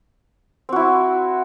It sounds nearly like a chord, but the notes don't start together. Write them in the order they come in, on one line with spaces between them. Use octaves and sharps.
C4 F#4 E4